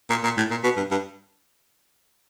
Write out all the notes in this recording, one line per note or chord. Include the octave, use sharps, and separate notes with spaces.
A#2
A#2
A2
A#2
B2
G2
G2